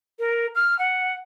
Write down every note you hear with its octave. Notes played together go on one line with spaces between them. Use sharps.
A#4
F6
F#5